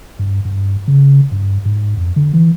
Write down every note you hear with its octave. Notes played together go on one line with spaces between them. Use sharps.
G2
G2
C#3
G2
G#2
F2
D3
E3